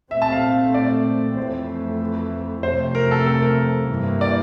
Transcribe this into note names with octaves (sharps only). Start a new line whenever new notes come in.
A#2 A3 C4 E5
A5
F5
D5
F2 E3 A3 C4 C5
F2 C3 F3 A3 C4 C5
A#4
A4
A4
A#4
G2 E3 A#3
D5